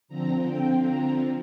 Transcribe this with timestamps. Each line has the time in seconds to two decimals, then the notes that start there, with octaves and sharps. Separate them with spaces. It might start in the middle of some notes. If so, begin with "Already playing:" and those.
0.08 D3 F3 C4 A#5
0.44 G5
0.81 A#5